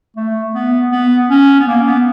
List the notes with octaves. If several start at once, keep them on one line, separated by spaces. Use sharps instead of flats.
A3
B3
B3
C#4
B3
A#3
B3